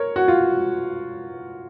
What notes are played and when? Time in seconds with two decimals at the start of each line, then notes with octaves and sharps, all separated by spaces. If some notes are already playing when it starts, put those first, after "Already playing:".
Already playing: A#4 C#5
0.16 F#4
0.28 F4